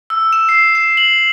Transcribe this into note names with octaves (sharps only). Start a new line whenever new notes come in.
E6
E7
C7
E7
F#7